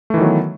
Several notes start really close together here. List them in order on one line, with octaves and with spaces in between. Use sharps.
A3 E3 D#3 F#3 B3